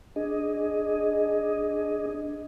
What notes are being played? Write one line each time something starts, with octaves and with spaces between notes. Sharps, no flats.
D4 G#4 D#5